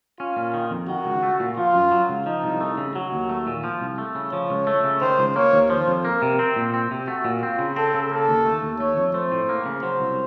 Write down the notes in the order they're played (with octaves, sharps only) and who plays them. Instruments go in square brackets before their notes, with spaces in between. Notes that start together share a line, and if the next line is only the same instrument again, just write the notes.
[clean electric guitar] C#4 [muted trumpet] F4
[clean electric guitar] A#2
D#3
F2
[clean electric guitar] D#3 [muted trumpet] F#4
[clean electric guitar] C#2
A3
A#2
[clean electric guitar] F3 [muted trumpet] F4
[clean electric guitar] F#2
F#3
C#2
[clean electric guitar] F3 [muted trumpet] D#4
[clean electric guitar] C2
A3
C#3
[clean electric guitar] F#3 [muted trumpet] F#4
[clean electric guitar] D#2
A3
A#2
F3
C2
A3
C#3
[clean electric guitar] F3 [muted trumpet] C#5
[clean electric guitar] C#2
A3
C#3
[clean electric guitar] D#3 [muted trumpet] C5
[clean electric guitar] C#2
[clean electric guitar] A#3 [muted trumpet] C#5
[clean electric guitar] D#2
[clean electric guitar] F3 [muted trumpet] C5
[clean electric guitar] F2
[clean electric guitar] A#3 [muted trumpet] A#4
[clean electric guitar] C3
C4
A#2
C4
C3
[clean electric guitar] A3 [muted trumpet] F#4
[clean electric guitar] A#2
[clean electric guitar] C4 [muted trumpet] F4
[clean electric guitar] C#3
[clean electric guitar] C4 [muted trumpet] A4
[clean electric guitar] C#3
[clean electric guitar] A#3 [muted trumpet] A4
[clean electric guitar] D#2
A3
D#2
[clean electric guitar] A3 [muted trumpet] C#5
[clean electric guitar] F2
[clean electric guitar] A3 [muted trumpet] C5
[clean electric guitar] A2
A#3
C#3
[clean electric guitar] F#3 [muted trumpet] C5
[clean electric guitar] C2